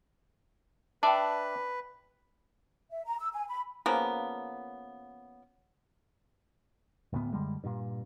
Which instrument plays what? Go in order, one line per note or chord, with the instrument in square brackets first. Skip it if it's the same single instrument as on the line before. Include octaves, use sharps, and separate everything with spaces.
[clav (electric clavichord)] D4 D5 E5 [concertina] B4 [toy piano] G5 A5
[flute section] E5
A#5
E6
G#5
B5
[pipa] C#3 F3 A#3 B3
[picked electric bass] D#1 D2 A2 B3
F#2 D3 G3 G#3
G2 A#2